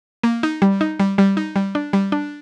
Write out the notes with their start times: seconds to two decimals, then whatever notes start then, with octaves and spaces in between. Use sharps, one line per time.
0.24 A#3
0.43 D#4
0.62 G3
0.81 D#4
1.00 G3
1.18 G3
1.37 D#4
1.56 G3
1.75 D4
1.93 G3
2.12 D4